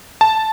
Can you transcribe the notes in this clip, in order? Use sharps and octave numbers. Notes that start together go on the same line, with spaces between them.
A5